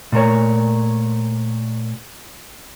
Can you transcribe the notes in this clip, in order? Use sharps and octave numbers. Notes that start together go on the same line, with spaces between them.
A#2 A3 A#4 C#5